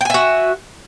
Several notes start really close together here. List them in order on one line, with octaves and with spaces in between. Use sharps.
G5 G#5 E5 F#4